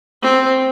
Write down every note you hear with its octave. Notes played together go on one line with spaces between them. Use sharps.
C4